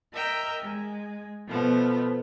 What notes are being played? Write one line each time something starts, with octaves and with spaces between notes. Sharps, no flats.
A#4 D#5 E5 G5 A#5
G#3
B2 F3 A3 B3